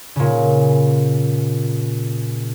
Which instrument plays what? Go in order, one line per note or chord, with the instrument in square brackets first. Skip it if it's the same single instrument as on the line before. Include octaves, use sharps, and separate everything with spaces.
[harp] A#2 C#3